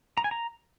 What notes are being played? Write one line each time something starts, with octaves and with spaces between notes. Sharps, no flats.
A#5
G#5
A#5